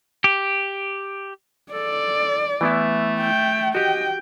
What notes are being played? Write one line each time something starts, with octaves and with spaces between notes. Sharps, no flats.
G4
A4 D5
E3 A3 B3 E4
G5
F#4 G4 D#5 G5